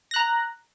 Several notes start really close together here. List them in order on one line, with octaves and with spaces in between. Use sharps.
A#6 F#6 A#5